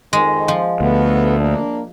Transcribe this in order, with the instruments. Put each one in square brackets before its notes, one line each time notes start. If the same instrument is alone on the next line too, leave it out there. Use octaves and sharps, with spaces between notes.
[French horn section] F2 D#3 [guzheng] G#3
[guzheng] F3
[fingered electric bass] D2 [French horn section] A3 B3
[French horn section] A#3 D4